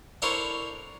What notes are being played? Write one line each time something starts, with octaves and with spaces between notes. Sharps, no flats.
D4 E4 A4 A#4 C5 C#5